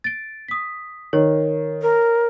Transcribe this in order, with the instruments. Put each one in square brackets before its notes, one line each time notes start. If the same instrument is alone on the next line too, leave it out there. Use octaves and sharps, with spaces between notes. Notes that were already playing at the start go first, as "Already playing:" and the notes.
[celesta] A6 D7
D#6 B6
[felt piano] D#3 [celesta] C#5
[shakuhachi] A#4